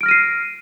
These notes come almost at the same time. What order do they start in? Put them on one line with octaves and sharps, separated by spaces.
D7 F6 A#6 D#7 C7